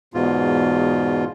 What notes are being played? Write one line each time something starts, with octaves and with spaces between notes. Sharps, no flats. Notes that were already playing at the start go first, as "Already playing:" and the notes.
E2 G#2 B2 F4